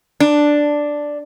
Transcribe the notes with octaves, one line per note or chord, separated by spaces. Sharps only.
D4